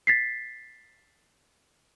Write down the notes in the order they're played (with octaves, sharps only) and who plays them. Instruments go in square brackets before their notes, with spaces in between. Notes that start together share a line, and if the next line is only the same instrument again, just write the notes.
[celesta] A6 B6 C7